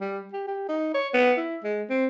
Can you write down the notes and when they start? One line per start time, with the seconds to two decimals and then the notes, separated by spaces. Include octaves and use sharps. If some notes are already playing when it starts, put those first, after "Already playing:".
0.01 G3
0.33 G4
0.47 G4
0.69 D#4
0.94 C#5
1.14 B3
1.37 E4
1.64 G#3
1.90 C4